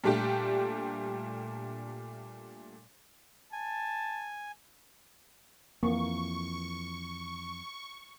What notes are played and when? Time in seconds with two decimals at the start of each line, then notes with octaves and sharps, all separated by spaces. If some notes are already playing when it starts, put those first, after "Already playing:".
0.04 A#2 G3 A3 D4 G4
3.53 G#5 A5
5.83 F2 E3 A#3 C#6